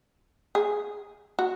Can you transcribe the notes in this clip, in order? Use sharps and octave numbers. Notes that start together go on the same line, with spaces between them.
G#4
F#4